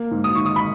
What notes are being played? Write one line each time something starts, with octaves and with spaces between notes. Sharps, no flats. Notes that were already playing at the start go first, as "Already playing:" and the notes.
Already playing: A#3
G#2
D#6
D#3 C#6
D#6
B5